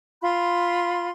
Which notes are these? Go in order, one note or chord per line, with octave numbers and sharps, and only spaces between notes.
F4 B5 C6